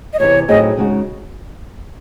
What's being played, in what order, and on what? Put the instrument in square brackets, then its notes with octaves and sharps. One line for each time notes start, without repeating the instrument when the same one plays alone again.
[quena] D#5
[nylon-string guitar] E2 C3 E3 [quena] C#5
[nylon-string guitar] A2 F#3 C4 D#4 G#4 [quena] D#5
[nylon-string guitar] C#3 G#3 D#4 F#4